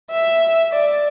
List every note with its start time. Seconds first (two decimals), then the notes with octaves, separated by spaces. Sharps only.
0.11 E5
0.72 D5